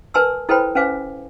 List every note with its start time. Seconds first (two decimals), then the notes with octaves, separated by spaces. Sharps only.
0.14 A#4 B4 G#5 A5 C6 E6
0.49 E4 A4 B4 C5 G5 B5
0.75 C#4 B4 C5 F5 G#5 D6